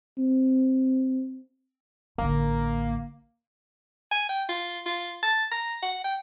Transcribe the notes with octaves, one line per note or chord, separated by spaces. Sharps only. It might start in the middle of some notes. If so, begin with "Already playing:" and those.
C4
A1 D3 A#3
G#5
G5
F4
F4
A5
A#5
F#5
G5